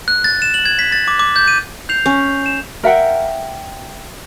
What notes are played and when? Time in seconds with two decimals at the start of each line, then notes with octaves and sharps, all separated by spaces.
0.08 F#6
0.24 A6
0.42 E7
0.54 F#7
0.65 G#6
0.79 B6
0.92 A6
1.08 D6
1.19 D6
1.36 G6
1.48 D#7
1.89 G6 C7 F7
2.06 C#4
2.46 E7
2.84 A#4 E5 F#5 G5